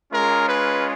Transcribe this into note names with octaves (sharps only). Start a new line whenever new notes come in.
G#3 C#4 F4 A#4
B4